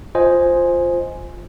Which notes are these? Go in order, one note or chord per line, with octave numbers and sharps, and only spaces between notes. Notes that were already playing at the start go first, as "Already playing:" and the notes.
F4 C5 D#5 G#5